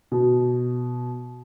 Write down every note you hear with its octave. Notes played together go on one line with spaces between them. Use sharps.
B2